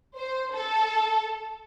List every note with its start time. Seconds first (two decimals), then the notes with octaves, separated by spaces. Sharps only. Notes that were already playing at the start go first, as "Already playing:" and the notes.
0.17 C5
0.53 A4